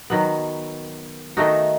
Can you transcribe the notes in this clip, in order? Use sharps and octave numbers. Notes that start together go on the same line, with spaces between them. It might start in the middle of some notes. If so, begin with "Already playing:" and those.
D#3 F#3 B3
D#3 A3 D#4 F#4